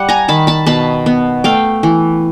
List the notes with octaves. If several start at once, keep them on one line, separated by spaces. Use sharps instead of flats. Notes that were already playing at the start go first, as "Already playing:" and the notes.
Already playing: G3 F#5
G#5 A#5
D#3 A5 B5
A5 B5
B2 A5 B5
B3
A3 F5 G5
E3